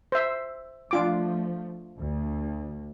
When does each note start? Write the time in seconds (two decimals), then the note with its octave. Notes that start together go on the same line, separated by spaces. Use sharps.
0.12 C5 E5
0.91 F3 A3 D4 F4 D6
2.00 D2